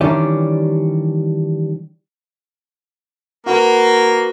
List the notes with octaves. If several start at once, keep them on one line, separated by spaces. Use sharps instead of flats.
D#3 E3 G3 C#4 D4 G4
A#3 F#4 B4